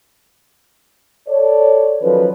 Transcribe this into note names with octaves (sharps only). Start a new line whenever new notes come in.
A4 C#5 D5
D#3 F3 F#3 C#4 A4 B4